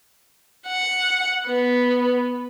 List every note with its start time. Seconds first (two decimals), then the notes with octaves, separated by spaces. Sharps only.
0.67 F#5
1.46 B3